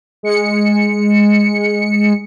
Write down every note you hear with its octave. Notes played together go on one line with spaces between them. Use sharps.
G#3 C#7